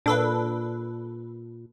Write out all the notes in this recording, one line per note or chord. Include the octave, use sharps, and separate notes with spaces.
A#2 D4 A4 B4